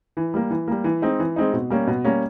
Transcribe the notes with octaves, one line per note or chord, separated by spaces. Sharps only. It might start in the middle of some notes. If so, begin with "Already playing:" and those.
E3
G3 A#3
E3
G3 A#3
E3
G#3 C4 D#4
E3
G#3 C4 D#4
B2
G3 A#3 C#4
B2
G3 A#3 C#4